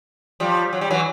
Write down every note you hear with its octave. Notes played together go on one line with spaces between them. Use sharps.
F3 G3
F#3
G3
E3 F#3